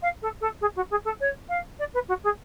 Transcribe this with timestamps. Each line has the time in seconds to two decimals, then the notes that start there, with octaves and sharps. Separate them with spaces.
0.02 F5
0.22 A4
0.41 A4
0.61 G#4
0.76 F#4
0.90 G#4
1.05 A4
1.20 C#5
1.49 F5
1.79 D5
1.94 B4
2.08 F#4
2.24 G#4